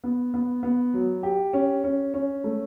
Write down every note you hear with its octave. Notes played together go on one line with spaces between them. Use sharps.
B3
B3
B3
F#3
G4
C#4
C#4
C#4
A3